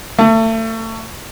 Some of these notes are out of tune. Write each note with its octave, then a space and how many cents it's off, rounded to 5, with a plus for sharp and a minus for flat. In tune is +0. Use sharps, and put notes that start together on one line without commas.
A3 +30